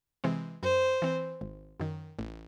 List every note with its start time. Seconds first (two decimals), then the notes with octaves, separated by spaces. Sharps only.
0.24 C3 E3 G#3 C4
0.63 F#2 C5
1.02 E3 C4
1.41 G#1
1.80 F#2 D#3
2.19 A1